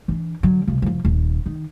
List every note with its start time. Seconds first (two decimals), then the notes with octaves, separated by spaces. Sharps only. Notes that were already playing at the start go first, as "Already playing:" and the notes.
0.08 E3 D4
0.43 D3 F#3
0.67 C2 F3
0.82 F#1 F3
1.05 D#1
1.46 D#3